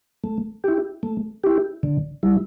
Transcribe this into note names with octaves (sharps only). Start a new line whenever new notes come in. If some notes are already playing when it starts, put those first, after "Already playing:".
A3
E4 G4
A3
E4 G4
D3
G3 E4